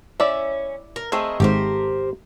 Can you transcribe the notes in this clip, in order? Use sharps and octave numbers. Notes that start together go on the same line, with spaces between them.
C#4 E4 D5 E5
A#4
A3 C4 G#4 A#4 D#5
G#1 G#2 G4 A#4 C5